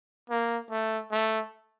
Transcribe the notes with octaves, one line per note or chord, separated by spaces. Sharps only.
A#3
A3
A3